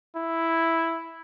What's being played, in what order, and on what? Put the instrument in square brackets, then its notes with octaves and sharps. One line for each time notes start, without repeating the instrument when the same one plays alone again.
[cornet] E4